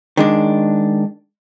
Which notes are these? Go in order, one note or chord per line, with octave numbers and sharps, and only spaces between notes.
D#3 G#3 D4